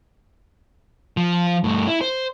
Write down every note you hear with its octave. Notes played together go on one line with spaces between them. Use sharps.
F3
G2 A3
E4
C5